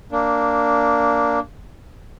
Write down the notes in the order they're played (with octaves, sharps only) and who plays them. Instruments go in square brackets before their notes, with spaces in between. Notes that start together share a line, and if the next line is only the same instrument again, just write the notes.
[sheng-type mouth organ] A#3 D4